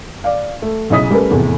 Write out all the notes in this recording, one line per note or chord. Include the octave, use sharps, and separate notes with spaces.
D5 F5
A3
B1 C#3 E4 D#5 D#6 B6
G3 A3 C#4 A#4 B4
F1 E2 A2